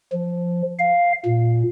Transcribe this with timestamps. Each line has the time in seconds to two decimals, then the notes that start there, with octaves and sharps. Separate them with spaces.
0.12 F3
0.79 F5
1.25 A#2